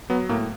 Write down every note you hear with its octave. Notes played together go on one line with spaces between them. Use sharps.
F#3 B3
A2 A#3